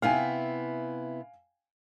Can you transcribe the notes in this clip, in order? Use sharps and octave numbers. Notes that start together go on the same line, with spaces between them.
C3 B3 E4 F5 G5 G#5